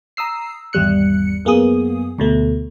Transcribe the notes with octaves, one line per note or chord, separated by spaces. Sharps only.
A#5 D#6 E6 C7
G#1 E2 G3 F#6 C#7
F#2 A#3 B3 G#4 D#6
D2 B2 A3